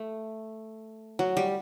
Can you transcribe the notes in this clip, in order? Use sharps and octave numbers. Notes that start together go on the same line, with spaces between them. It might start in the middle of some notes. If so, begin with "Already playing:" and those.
Already playing: A3
F#3
G3